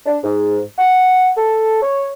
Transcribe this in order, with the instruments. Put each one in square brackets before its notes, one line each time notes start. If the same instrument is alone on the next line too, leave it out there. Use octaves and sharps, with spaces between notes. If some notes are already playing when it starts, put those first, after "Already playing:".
[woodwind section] D4
G#2
F#5
A4
C#5